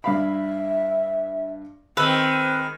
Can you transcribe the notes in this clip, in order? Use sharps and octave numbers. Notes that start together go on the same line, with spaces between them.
G2 E5 F5 B5
D#3 G#3 C4 B4 E6